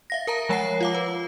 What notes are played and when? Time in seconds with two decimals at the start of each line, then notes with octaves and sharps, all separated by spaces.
0.10 E5 F5 A#6
0.27 A#4 A5 A#5
0.49 F3 G#3 C#5 F#5 A5 C7
0.81 F4 F5 D6
0.95 B4